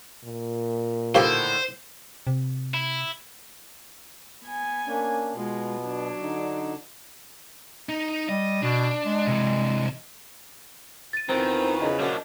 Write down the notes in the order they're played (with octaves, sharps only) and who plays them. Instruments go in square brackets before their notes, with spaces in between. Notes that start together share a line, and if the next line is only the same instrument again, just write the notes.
[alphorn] A#2
[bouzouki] A2 D3 D#3 [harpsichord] F3 G4 [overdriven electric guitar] C5
[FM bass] C3
[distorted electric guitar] E4
[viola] B3 G#5
[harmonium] A#3 C#4 D4
[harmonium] B2 B3 [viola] G#3 F4
[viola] F#3 D4
[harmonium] D3 D#4
[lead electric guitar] D#4
[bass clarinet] G3 [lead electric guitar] D#5
[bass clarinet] B2 [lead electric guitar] D4
[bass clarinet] G#3
[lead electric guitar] C3 E3
[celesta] A6 D#7
[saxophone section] E2 F3 B4 [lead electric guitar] D#3 [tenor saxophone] C4
[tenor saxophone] C#3 [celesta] D#5
[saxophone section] F#2 [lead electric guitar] F3 D4